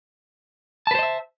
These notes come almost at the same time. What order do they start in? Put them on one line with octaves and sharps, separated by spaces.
A5 B4 C5 D#5 E5